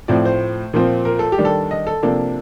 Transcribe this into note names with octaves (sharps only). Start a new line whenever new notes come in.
A2 F3 C4 D5
C5
A#2 F3 C4
A#4
A4
G4
D#3 G3 D4
A4
D#5
A4
C3 F3 A#3 D4 A4